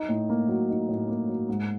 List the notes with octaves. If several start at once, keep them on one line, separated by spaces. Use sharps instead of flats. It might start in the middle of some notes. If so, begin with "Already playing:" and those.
Already playing: D#4
A2
A#3
F#3
D#4
A2
A#3
F#3
G#2